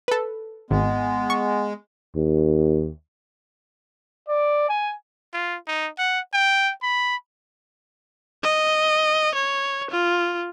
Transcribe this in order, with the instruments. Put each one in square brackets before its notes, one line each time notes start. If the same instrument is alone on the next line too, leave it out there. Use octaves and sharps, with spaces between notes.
[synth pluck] A4 B4
[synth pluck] G#1 [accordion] G#3 [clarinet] B3
[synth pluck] C#6
[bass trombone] D#2
[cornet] D5
G#5
F4
D#4
F#5
G5
B5
[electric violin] D#5
C#5
F4